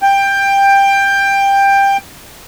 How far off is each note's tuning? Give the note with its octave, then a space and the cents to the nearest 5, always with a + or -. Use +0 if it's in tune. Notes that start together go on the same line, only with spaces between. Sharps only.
G5 +15